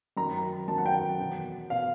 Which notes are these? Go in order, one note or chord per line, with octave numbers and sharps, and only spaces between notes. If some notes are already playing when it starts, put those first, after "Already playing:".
F#2 D#3 A#5
F#2 D#3 A5
F#5
G5
E2 B2
B2 F5